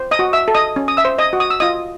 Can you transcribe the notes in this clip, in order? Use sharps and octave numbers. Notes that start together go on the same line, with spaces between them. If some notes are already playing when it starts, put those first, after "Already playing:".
Already playing: C5
D#5 D#6
F#4
E5 E6
A4
D#5 D#6
C#4
D#6
E5 E6
C5
D#5 D#6
F#4
D#6
E6
F4 D#5 D#6